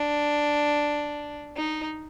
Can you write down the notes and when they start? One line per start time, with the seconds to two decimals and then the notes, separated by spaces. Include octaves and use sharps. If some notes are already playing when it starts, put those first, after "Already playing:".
Already playing: D4
1.56 D#4